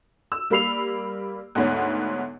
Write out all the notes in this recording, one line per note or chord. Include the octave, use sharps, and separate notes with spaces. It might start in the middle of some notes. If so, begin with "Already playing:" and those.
E6
G3 A#3 B5 C7 F7
D2 G#2 B3 C#5